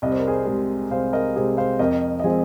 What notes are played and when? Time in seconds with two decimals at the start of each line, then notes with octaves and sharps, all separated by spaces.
0.02 C2 D#5
0.11 C5
0.19 A#4
0.28 G#4 C5
0.47 C3 G#3
0.91 C2 C5 F5
1.13 A#4 D#5
1.35 C3 G#3 G#4 C5
1.57 C5 F5
1.79 F2 A#4 D#5
2.20 D#5
2.24 F3 G#3 C4 G#4 C5